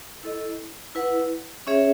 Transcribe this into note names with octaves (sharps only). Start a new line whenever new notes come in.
E4 A4 D#5
E4 B4 F#5
C#4 G#4 C#5 E5